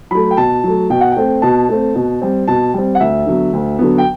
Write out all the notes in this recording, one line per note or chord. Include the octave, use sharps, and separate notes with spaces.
F#3 A3 B5
G5
B2 A5
F#3 A3
B2 G5
F#5
G5
A3 C4
B2 A5
A3 C4
B2
G3 C4
B2 A5
G3 C4
F#5
D2 E5
D3 F#3 B3
D2
D3 F#3 B3
G5